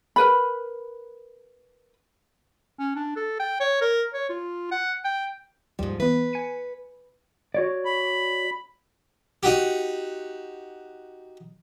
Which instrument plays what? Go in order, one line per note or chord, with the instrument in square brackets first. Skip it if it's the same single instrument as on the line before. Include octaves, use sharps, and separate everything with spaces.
[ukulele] A#4 B4 B5
[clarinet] C#4
D4
A4
G5
C#5
A#4
C#5
F4
F#5
G5
[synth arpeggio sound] D#2 G3 [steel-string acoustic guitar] G#2 F3
[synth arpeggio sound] E3 B3 [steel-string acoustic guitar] B4
[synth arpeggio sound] G#5 C#7 D#7
[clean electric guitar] F#4 C#5 D5
[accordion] B5
[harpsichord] D#4 F#4 G4